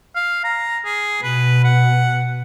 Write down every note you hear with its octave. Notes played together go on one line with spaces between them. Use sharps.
F5
A#5
G#4
B2 B4
F#5